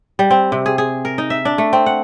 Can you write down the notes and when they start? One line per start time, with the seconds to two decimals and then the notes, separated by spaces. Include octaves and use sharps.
0.19 G3
0.31 C4
0.52 C3
0.66 G#4
0.78 G#4
1.05 A#4
1.18 D#4
1.30 E5
1.45 D4
1.58 A3
1.73 C4
1.86 F#5